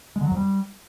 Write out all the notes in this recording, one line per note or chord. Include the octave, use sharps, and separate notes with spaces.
G#3
D3
F#3
F2
G3